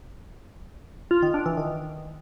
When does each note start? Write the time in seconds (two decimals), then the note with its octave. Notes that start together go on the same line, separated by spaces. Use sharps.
1.11 F4
1.22 D#3
1.34 D4
1.46 E3
1.57 D#3